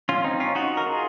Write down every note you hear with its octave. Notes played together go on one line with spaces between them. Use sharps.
C#4 F4
C4 D#4
C#4 F4
D#4 F#4
A#4
F4 G#4